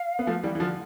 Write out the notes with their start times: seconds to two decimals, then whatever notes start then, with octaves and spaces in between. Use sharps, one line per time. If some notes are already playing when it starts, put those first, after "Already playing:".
Already playing: F5
0.19 B3
0.27 F3 A3
0.44 E3 G3
0.55 E3
0.60 D3 F3